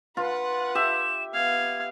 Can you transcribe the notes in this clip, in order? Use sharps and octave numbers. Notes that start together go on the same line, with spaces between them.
F4 B4 F#5
G4 E5 E7
B3 F5 G#6